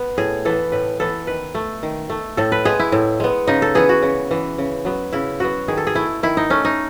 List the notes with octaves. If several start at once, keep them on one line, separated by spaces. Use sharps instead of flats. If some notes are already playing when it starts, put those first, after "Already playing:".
Already playing: B3
A2 G#4
E3 B3 A4
A2 B4
E3 B3 A4
D#3 B4
A3
D#3
A3
A2 A4
B4
G#3 B3 G#4
E4
A2
G#3 B3
C#3 D#4
A4
E3 B3 G#4
F#4
C#3
E3 B3
C#3
F#3 B3
C#3 E4
F#3 B3 F#4
D#3 G#4
A4
G#4
A3 E4
D#3 E4
D#4
A3 C#4
D#4